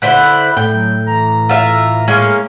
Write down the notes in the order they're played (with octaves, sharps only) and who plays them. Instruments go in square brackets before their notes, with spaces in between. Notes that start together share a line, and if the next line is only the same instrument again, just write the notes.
[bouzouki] D3 E4 C5 [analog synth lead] F#6
[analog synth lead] A2 [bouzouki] G5
[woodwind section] F#3
E3 A#5
[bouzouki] F4 E5
[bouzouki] G#3 A#3 C#4 [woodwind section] F5